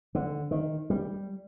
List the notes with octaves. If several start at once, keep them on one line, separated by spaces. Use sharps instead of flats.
D3
D#3
G3